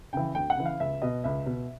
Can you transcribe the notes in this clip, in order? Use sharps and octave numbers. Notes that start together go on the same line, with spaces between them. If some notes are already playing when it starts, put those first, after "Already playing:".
C#3 E3 G5
D2 G5
F#5
C#3 E3
F5
C#2 E5
B2 D#5
C#2 E5
B2